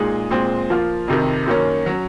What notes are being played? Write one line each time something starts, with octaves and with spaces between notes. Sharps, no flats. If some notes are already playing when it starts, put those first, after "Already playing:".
Already playing: A#2 G#3 D#4 G#4
A#2 G#3 C4
F3 A#3 F4
F2 C3 D#3
F#2 D#3 A#3 C#4
F#3 C#4